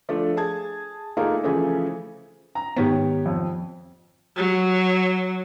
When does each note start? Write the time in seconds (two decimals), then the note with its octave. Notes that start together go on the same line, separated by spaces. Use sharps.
0.09 F3 A3 D4 A4
0.37 G#4 A5 G#6
1.17 A3 A#3 D#4 F4 G#4 A#4
1.43 C#3 E3 F3 A3 G#4 G#5
2.55 A#5
2.76 G#2 D#3 B3 G4 C#5
3.26 F2
4.36 F#3